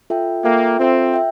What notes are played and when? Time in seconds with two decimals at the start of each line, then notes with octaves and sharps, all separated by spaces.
0.10 F4 A4 E5 G5
0.44 A#3 F4 A4 E5 G5
0.80 C4 F4 A4 E5 G5
1.14 E5 G5